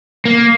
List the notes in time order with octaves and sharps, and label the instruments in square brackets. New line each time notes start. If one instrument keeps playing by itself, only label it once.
[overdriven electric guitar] A#3